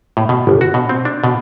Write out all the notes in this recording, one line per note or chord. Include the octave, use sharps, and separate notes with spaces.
A2
B2
G1
F#4
B2
C4
D4
B2